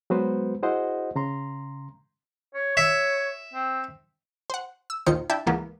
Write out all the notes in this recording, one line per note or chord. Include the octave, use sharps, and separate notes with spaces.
F#3 G#3 B3 F#4 B4 C5
E4 F#4 G#4 C5 D#5 F#5
C#3 A#5 C6
C#5
C#5 E5
C4
C5 F#5
E6
A#1 D#2 D#3 F4 C5 C#7
D4 E4 E5 G5 A5
C#2 G#2 E3 A#3 B3